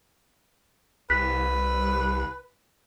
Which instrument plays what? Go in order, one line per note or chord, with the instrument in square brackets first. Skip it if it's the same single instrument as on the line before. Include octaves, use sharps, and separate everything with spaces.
[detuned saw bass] C2 [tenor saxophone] B4 [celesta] F#6 B6